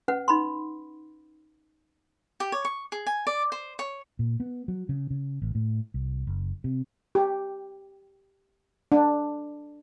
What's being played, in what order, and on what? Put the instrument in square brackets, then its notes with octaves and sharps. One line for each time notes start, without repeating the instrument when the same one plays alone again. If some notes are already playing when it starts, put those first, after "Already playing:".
[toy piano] C#4 B4 F#5
D#4 B5 C6
[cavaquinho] G4
C#5
C#6
G#4
G#5
D5
C5
C#5
[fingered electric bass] A#2
B3
F#3
C#3
C#3
A1
A2
C2
F#1
C3
[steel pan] G4
D4